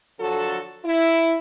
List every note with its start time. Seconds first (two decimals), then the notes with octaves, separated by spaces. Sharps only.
0.20 D3 F3 F#3 F#4 A4
0.84 E4